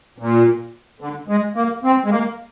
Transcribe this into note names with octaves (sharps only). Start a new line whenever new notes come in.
A#2
D3
G#3
A#3
C4
G#3
A#3